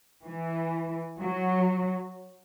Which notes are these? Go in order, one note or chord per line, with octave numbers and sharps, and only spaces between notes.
E3
F#3